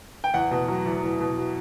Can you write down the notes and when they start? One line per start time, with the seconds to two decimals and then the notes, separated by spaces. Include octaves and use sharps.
0.24 G5
0.34 E2 F#5
0.51 B2
0.68 F#3
0.86 E2
1.03 E2
1.20 B2
1.37 F#3